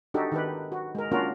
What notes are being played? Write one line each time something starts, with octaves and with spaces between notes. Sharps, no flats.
D4 D#4 F#4 G4 A4
D#3 G4 B4
F#4
G#3 A#4
A#3 C#4 D4 F4 F#4 A#4